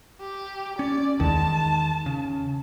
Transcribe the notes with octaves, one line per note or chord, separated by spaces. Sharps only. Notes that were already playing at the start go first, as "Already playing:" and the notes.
G4
C#4 D5
E2 D#3 G#3 A5
C#3